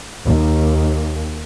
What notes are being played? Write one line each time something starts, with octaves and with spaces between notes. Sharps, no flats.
D#2